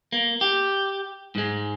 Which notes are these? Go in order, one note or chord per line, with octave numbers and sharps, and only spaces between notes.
A#3
G4
G#2 G#3